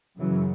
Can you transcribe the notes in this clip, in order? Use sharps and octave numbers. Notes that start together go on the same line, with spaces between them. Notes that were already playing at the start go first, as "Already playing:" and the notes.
F#2 C#3 E3 F#3